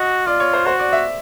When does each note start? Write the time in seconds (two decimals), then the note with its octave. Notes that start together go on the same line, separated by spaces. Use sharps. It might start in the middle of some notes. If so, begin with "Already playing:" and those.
Already playing: F#4 D#5
0.27 F4 D5
0.40 C#5
0.53 C5
0.66 F#4 C5
0.79 D5
0.92 E5